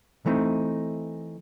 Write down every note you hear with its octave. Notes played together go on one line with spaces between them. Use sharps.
E3 A3 C4 D#4